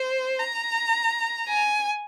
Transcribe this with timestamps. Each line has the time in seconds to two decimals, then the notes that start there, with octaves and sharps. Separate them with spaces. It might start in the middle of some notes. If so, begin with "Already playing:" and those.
Already playing: C5
0.40 A#5
1.49 G#5